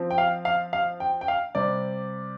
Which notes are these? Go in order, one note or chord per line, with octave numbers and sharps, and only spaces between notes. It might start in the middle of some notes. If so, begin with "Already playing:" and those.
Already playing: F3 C4
G5
F5
F5
F5
G5
G5
F5
C3 G3 C4 D5